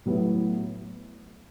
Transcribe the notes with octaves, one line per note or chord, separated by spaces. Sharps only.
A2 F#3 B3 E4